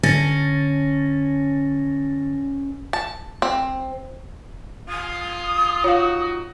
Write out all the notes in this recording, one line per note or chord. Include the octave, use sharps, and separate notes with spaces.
D3 C#4 A6 A#6
A5
C4
F4 D#6
D#4 F4 F#4 C#5 F5